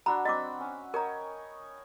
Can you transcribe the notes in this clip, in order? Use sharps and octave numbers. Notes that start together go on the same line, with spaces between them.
D4 F#4 A#5 B5 E6
C4 D#5 B5 D6
C#4
A#4 C#5 D#5 G5 A#5